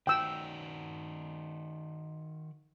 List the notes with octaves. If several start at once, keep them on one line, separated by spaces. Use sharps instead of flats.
D#3 F#4 G5 E6